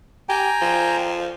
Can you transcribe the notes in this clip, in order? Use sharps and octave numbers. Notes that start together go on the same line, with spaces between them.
G4 G5 G#5 A#5
F3